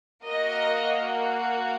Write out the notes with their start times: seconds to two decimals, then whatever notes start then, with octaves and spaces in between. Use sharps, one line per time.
0.24 A#3 F#4 A#4 D#5